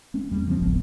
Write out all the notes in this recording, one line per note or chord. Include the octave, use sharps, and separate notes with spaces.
G#3 A#3 C4 C#4
E2 G3
C#3 F3 A3 C4
D1 G#1 G#2 B3